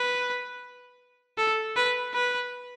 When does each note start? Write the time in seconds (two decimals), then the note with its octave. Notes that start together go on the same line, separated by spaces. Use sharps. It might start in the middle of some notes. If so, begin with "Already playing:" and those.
Already playing: B4
1.38 A4
1.76 B4
2.14 B4